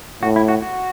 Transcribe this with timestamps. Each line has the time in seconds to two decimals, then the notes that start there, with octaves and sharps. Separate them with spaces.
0.22 A2 F#4
0.36 E4
0.48 F#4
0.62 F#4